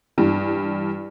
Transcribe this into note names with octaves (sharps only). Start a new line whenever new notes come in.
G2 E3